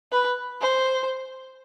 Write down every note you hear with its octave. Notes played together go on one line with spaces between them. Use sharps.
B4
C5